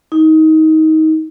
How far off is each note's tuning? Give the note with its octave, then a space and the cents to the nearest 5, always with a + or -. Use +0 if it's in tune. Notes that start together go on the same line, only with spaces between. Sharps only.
D#4 +20